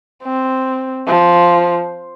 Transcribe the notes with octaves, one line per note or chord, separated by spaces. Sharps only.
C4
F3